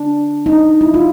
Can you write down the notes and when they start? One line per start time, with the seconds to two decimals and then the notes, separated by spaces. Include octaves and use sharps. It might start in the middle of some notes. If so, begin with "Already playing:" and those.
Already playing: D4
0.46 D#4
0.81 E4
0.94 F4